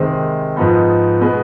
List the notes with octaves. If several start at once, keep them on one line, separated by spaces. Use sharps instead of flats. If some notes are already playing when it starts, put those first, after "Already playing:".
Already playing: C3 D#3 G#3 C4
G#2 F3 B3 D#4
B2 G#3 B3